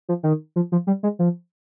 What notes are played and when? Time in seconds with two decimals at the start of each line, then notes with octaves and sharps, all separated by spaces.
0.09 F3
0.23 D#3
0.56 F3
0.72 F3
0.87 G3
1.03 G#3
1.19 F3